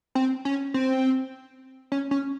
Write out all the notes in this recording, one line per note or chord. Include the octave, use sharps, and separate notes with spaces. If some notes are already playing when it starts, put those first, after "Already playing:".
C4
C#4
C4
C#4
C#4